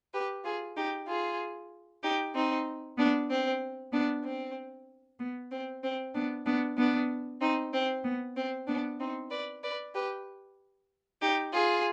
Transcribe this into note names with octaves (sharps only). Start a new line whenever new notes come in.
G4 B4
F4 G#4
D#4 G4
F4 G#4
D#4 G4
C4 D#4
B3 D4
C4
B3 D4
C4
B3
C4
C4
B3 D4
B3 D4
B3 D4
C4 D#4
C4
B3
C4
B3 D4
C4 D#4
B4 D5
B4 D5
G4 B4
D#4 G4
F4 G#4